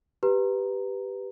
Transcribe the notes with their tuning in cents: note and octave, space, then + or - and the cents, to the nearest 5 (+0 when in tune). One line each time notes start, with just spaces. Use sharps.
G4 +0 B4 +0 A#5 +0